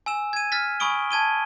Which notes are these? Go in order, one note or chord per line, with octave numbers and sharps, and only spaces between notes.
G#5 E6 E7
G#6 D#7
F6 A6 B6
G#5 B5 C#6 D#6 D7 G7
A5 G#6 D#7 G7